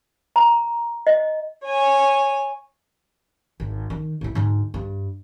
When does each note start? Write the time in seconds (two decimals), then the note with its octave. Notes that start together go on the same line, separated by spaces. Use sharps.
0.36 A#5
1.07 D#5
1.63 C#5 G#5
3.60 G#1
3.90 D#3
4.21 A2 E4
4.35 D2 G#2
4.74 G2